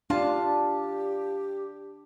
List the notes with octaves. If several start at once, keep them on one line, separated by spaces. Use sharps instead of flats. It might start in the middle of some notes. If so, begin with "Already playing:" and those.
D4 F4 G4 A5